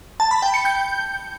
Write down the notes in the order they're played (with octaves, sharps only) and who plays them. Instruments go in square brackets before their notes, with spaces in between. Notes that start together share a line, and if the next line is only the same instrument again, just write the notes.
[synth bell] A5
B5
G5
C#7
G6